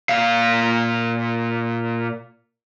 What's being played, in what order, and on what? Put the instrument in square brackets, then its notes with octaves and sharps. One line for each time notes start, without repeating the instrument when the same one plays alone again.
[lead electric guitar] A#2 F5